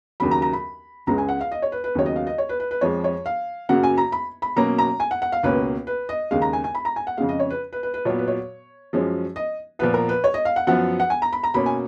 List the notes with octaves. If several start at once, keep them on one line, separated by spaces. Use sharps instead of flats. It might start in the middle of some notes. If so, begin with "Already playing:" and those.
D#2 C#3 F#3 B5
A#5
A#5
B5
C#2 C#3 G#3 A#5
G#5
F#5
F5
D#5
C#5
B4
B4
D#2 C#3 F#3 B3 C#5
D#5
F5
D#5
C#5
B4
B4
B4
F2 F3 G#3 C#5
C#5
F5
F#2 C#3 F#3 A#3 F#5
G#5
A#5
B5
B5
B2 F#3 A#3 C#4 A#5
A#5
G#5
F#5
F#5
F5
C#2 B2 A#3 C#4 B4
B4
D#5
D#2 C#3 G#3 F5
A#5
G#5
G#5
B5
A#5
G#5
F#5
F2 C#3 G#3 F5
D#5
C#5
B4
B4
B4
B4
A#2 F#3 B3 C#5
B4
C#5
F#2 F3 G#3 C#4
D#5
A#2 F3 B3 B4
A#4
B4
C#5
D#5
F5
F#5
F#2 F3 B3 F#5
F#5
G#5
A#5
B5
A#5
B2 A#3 C#4 B5
G#5